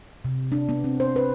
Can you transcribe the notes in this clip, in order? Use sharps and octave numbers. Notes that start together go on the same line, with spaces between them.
C3
D4
B3
C4
C5
B4